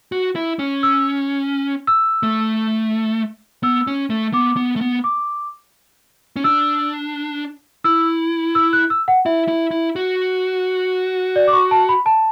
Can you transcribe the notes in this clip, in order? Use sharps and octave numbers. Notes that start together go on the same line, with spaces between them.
F#4
E4
C#4
E6
E6
A3
B3 E6
C#4
A3
B3 D6
B3
A3
B3
D6
C#4
D4 E6
E4 E6
E6
F#6
E6
F#5
E4 E5
E4
E4
F#4
D5
D6
C#6
A5
B5
A5